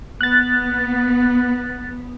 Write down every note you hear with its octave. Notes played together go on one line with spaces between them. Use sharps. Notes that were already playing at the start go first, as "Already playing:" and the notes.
B3 F#6 A6